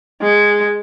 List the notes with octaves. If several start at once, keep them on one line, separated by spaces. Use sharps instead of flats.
G#3